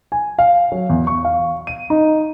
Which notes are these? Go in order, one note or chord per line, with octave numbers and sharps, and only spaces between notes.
G#5
F5
F#3
E2
C#6
F5
D#7
D#4